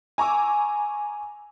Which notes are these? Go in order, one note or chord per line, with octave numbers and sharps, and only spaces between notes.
G#5 A#5 C#6 D6 E6